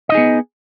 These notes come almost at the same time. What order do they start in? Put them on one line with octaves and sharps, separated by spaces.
D#5 D#4 G#4 B3